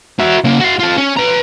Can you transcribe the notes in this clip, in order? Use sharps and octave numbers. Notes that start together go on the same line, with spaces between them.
F#4 E5
C#3 A#3
F#4 F5
F4 A4
C#4
B4 A#5